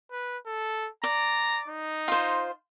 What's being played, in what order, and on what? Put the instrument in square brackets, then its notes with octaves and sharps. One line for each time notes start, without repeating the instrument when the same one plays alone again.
[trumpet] B4
A4
[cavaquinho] D5 [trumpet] A#5
[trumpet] D#4
[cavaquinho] F4 C5